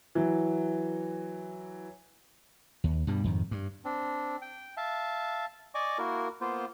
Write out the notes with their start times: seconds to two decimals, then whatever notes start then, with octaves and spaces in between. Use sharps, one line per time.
0.15 E3 F#3
2.84 D#2
3.07 G2 B2 G3
3.24 F2 G#2 D#3
3.51 G2
3.85 C4 D4
4.41 G5
4.77 E5 F5 A5
5.75 D5 D#5 G#5 C#6 D6
5.98 A#3 E4 F#4 A#4
6.41 A#3 B3 F4 C5